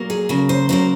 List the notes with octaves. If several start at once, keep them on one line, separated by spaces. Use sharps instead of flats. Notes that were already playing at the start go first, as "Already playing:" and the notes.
Already playing: A#2 F#3 A#3
G#4
C#3 F#3 A#3
C5
C#3 F#3 A#3 C5